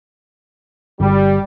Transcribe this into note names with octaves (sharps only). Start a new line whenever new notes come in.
G1 G3